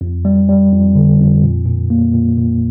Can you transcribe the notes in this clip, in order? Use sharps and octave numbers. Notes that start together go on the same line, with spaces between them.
F2
G3
G3
F2
D3
F2
A#2
A#2
A#3
A#2
A#2